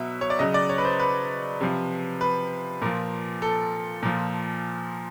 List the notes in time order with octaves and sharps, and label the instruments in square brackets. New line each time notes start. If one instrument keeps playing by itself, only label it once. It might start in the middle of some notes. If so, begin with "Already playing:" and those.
Already playing: [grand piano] B2 F#3 E5
C#5
D5
C#3 F#3 D#5
D5
C#5
B4
C5
B4
C3 F3
B4
A#2 F3 A#4
A4
A#2 F3